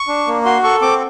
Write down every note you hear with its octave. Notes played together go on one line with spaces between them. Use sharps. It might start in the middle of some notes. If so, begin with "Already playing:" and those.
Already playing: C#6
D4
A#3
F#4 C6
A4 C#6
C4 D6